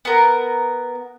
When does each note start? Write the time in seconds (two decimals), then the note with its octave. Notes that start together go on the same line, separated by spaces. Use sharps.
0.05 B3 A#4